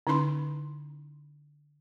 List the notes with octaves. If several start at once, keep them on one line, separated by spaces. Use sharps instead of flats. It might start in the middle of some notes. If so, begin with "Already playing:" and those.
D3 C#4 D#4 E4 B5 C6